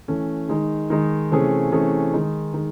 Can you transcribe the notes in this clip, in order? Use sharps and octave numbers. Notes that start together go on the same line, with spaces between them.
E3 A3 C#4
D#3 G#3 D#4
D#3 G#3 D#4
C3 E3 A3 C#4 G#4
C3 E3 A3 C#4 G#4
D#3 G#3 D#4
D#3 G#3